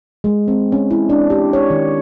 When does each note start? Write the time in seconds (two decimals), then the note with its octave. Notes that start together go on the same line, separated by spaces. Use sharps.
0.24 G#3
0.48 C4
0.72 C#4
0.91 E4
1.09 D4
1.30 G4
1.53 C#5
1.70 D#3